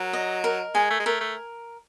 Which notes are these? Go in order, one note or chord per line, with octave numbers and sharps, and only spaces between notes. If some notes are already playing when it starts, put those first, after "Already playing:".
Already playing: F#3 A#4
D#5
A#4
G#3 G#5
A3
G#3
A3 A#4
A3